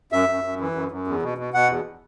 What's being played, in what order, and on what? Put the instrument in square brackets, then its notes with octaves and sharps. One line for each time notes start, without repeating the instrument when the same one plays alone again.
[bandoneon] F#2 E5
F#2
F#2
E3
F#2
F#2
E2
B2
B2
B2 F#5
E2